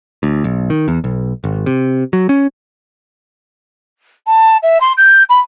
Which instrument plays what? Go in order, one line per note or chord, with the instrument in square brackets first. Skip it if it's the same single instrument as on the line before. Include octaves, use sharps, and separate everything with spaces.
[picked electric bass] D2
B1
D#3
E2
B1
G#1
C3
F#3
C#4
[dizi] A5
E5
C6
G6
B5